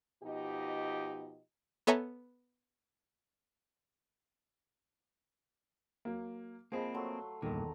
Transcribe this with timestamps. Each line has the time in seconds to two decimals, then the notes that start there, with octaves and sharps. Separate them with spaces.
0.23 B2 F3 D#4 G4 D#5
1.87 B3 A4 C#5 E5 G#5 A#5
6.05 F#3 A#3
6.72 F3 A#3 C4 G#4 D#5 B5
6.94 F#3 A3 C6
7.42 E1 G2 A#2 D#3 A4 A#5 D#6